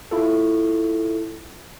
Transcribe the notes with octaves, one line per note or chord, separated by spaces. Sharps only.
E4 F4 A4